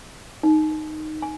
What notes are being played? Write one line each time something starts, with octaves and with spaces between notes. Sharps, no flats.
D#4
G#5